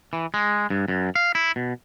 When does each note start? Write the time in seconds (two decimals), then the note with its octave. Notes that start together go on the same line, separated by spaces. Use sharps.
0.13 E3
0.34 G#3
0.70 G2
0.88 F#2
1.16 F5
1.35 E4
1.56 B2